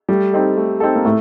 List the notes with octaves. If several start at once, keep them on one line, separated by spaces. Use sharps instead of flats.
G3 A3
C4 D#4 A4
A3
C4 D#4 A4
A#3
A2 A3